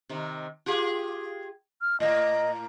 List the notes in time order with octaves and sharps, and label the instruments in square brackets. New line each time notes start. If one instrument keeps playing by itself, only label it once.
[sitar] C3 D#3
F4 G4 G#4
[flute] F6
[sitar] A2 A#3 [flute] D#5